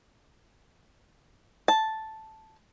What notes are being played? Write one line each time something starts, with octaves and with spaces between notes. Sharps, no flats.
A5